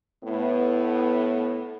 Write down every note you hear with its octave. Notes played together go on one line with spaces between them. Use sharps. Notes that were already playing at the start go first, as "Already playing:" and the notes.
A2 B3